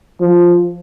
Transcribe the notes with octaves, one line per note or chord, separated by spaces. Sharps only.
F3